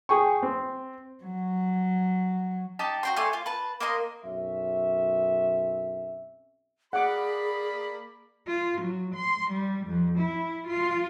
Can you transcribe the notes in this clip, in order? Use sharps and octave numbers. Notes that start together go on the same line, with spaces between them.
G#4 G5 C#6
C4
F#3
D#4 G4 A5
F#4 G5 C6
A3 D5 G#5 C6
F4
B4 A5
A#3 A#4 D#5 C6
B1 F#2 C4 C#4 E5
A#3 G#4 D5 F#5 B5 D6
F4
F#3
C6
G3
F2
E4
F4